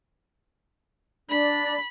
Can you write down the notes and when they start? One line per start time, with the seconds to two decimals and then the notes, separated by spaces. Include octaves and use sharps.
1.29 D4 D5 B5